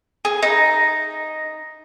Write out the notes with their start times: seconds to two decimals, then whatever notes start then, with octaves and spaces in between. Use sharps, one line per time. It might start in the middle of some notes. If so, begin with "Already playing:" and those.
0.25 G#4
0.43 D#4